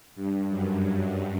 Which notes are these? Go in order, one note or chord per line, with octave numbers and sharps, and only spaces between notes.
G2
F#2